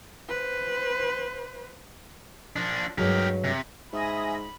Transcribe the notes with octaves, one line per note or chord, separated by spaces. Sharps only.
B4 C5
F3 D4
G2 F#3 G#3 G4 A#4
C3
G#2 E5 G#5 B5 D#6 A#6